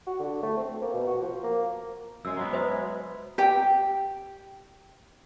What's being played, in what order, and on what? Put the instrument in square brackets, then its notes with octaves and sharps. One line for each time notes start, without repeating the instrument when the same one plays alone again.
[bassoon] F#4
D3
A3
C4
A#3
B2
F#4
F3
A#3
[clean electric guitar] F#2 G#3 [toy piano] E6
[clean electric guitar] F#3 G#3 B3
[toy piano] B4 C5 E5
[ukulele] G4 G5